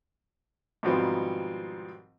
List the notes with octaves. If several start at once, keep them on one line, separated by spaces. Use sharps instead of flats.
G#2 B2 D#3 F3 G3 C4